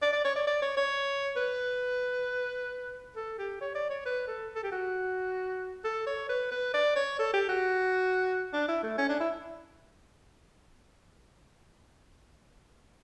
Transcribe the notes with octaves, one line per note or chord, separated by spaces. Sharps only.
D5
D5
C#5
D5
D5
C#5
C#5
B4
A4
G4
C#5
D5
C#5
B4
A4
A4
G4
F#4
A4
C#5
B4
B4
D5
C#5
A4
G4
F#4
D4
E4
A3
C#4
D4
E4